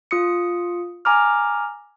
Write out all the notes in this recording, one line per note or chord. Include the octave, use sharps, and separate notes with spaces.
F4 D#6 C#7
G#5 A#5 D6 F6